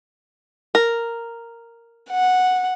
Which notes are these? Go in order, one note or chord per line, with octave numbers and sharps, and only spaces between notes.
A#4
F#5